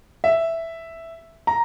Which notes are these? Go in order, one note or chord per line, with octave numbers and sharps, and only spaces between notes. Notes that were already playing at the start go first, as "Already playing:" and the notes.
E5
A#5